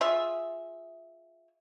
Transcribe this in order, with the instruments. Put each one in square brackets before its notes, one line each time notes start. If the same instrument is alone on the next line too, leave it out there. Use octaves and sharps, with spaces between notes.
[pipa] F4 G#4 E5